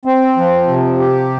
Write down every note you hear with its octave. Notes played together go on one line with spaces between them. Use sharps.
C4
F3
C3
G4